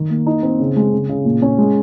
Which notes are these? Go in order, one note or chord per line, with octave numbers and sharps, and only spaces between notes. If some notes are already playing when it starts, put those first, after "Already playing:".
Already playing: D#3
A#3
D#4
C4
C#3
G#3
C#3
C#3
A#2
C#4
G#3